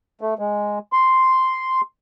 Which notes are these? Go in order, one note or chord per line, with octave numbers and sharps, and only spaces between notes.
A3
G#3
C6